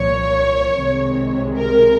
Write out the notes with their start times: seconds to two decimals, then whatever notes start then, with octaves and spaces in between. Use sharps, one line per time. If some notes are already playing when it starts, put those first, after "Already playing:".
Already playing: C2 A#2 F3 C#5
0.82 C2 C3 D#3 G#3
1.57 A#4